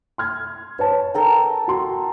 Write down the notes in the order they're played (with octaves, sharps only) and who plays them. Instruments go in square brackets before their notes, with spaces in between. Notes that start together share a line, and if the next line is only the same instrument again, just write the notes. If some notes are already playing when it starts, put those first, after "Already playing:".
[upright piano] C6 F6 G#6
B4 C#5 A5
[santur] A4 A#4 G5
[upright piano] F#4 C6